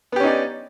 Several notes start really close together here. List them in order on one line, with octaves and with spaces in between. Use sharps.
B3 G4 C#4 D#4 D5